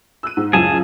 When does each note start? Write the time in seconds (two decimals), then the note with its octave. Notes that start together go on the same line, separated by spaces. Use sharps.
0.23 E6 F#6 D#7
0.37 G#2
0.53 C#2 F#2 A2 G#4 G#5 A5